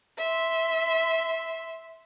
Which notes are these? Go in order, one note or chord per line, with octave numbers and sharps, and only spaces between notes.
E5 C6